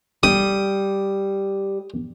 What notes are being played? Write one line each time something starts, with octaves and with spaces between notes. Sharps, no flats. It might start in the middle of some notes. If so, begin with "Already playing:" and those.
G3 D#6